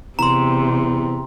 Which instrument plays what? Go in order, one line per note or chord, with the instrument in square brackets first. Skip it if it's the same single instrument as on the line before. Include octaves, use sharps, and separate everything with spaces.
[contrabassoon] E2 [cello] C3 [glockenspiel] A#5 C6